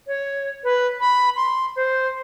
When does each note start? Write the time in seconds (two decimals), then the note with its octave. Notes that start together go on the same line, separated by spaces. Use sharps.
0.07 C#5
0.64 B4
1.00 B5
1.36 C6
1.76 C5